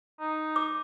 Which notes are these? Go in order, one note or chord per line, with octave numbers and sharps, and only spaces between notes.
D#4
D6